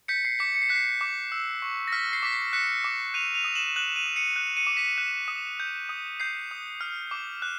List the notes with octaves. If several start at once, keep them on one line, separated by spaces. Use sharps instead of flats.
G6 B6 C#7
C7
D6 B6 C#7
C#7
C7
F#6 B6
C7
D6
E6
C#6
A#6
F6 B6
C7
D6 B6
C7
F#6 B6 C#7
D6
F#6 D#7 F7
D#7 F7
D#6
E7 F#7
F#6 E7 F#7
D#7 F7
D#6
C#7 D#7
F#6
C#7 D#7
D6
B6 C#7
F#6
D#6
G6
D#6
G6 C7
D#6
F6
D6
F#6